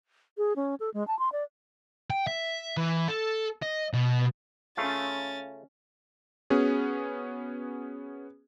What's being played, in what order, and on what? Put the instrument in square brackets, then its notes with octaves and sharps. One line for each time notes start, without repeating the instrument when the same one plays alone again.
[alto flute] G#4
C#4
A4
G#3
A5
C6
D5
[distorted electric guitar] G5
E5
E3
A4
D#5
B2
[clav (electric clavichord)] C#3 A3 F4 [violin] C#4 A6
[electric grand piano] B3 C#4 F#4 G#4